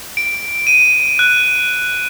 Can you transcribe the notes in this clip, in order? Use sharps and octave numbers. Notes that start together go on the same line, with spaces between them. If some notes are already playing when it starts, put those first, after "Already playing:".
D7
D#7
F#6